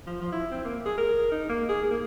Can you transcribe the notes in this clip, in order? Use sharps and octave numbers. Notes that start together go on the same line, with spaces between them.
F3
F3
E4
C4
A#3
G#4
A#4
D#4
A#3
G#4
A#3